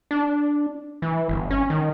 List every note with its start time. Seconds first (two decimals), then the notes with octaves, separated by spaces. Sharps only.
0.11 D4
1.02 E3
1.29 G1
1.51 C#4
1.70 D#3